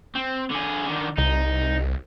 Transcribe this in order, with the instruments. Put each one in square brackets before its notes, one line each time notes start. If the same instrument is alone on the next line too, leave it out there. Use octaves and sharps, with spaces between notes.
[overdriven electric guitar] C4
D3 G#4
D3 D#3
[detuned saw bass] C2 [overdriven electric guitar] D#4